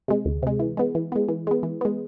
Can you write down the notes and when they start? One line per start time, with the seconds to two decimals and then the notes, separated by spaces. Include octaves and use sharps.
0.08 C3 G#3
0.25 D2
0.43 C3 G#3
0.59 E3
0.77 G#3 B3
0.95 E3
1.12 G#3 B3
1.28 E3
1.47 G#3 B3
1.63 E3
1.81 G#3 B3